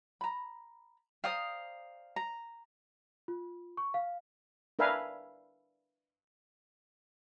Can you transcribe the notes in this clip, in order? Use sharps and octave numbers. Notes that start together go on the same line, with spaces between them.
A#5 B5
C5 D5 F5 G5 A#5 D#6
A#5
F4
C#6
F5
D4 A#4 B4 E5 F5 G#5